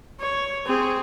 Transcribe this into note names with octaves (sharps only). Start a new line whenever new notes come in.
C#5
C4 G#4